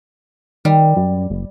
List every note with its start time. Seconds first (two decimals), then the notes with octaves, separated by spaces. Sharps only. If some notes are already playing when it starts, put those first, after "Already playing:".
0.65 D#3 G3
0.96 F#2
1.30 F#1